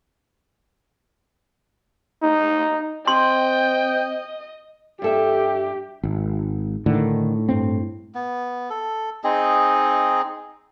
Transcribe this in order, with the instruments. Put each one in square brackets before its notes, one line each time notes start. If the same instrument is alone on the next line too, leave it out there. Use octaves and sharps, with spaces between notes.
[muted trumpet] D#4
[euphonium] C4 [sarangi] D#5 [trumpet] G5 [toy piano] C6
[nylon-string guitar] G2 A4 E5 [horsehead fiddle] G4
[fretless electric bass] G#1
[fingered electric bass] A2 [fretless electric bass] D3 D#3
[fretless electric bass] G2 C4
[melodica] B3
A4
C4 D#4 G#4 D#5